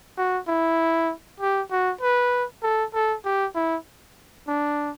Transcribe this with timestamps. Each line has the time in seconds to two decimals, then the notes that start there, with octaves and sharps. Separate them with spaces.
0.17 F#4
0.48 E4
1.40 G4
1.71 F#4
2.01 B4
2.63 A4
2.94 A4
3.25 G4
3.55 E4
4.48 D4